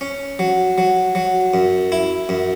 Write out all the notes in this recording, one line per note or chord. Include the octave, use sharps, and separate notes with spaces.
C#4
F#3
F#3
F#3
F#2
E4
F#2